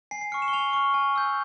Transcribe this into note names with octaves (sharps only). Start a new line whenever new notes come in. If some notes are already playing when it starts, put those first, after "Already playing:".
G#5 C7
C7
C#6 F6 C#7
E7
G7
G#5 F7
C#6 F6
G#5
E6 G6